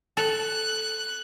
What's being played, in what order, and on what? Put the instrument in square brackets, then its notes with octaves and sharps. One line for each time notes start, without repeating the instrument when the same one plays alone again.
[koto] A4 [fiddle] F#6